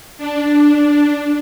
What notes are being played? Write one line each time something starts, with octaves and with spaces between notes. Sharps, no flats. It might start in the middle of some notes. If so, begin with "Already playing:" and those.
D4